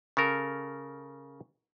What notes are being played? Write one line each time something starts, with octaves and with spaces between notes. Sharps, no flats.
C#3 A4 A#4